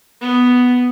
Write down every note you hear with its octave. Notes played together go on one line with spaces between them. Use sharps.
B3